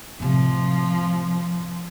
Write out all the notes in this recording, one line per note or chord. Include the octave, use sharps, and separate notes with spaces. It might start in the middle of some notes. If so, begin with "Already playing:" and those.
A2 C3 F3